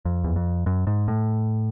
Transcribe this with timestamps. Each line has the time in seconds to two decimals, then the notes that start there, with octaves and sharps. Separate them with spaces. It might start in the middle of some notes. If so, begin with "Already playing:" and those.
0.05 F2
0.24 E2
0.36 F2
0.66 F#2
0.87 G#2
1.08 A2